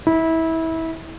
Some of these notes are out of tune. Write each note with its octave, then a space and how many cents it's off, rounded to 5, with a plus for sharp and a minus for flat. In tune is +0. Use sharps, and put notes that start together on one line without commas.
E4 -25